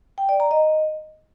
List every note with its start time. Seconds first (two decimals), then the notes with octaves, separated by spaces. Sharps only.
0.18 G5
0.29 D5
0.40 A#5
0.51 D#5